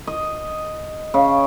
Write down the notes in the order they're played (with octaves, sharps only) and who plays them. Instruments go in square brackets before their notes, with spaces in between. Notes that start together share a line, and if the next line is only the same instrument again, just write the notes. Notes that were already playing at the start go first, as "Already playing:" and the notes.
[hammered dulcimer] D#5
C#3